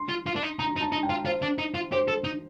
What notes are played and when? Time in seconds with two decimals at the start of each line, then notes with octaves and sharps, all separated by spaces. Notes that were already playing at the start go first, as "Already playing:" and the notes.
Already playing: C6
0.09 F4
0.27 F4
0.36 D4
0.43 D#4
0.59 D#4 A#5
0.76 D#4
0.81 A5
0.92 D#4
1.03 G5
1.09 F4
1.25 F4 C5
1.42 D4
1.59 D#4
1.74 F4
1.92 G4 C5
2.08 A4
2.24 D#4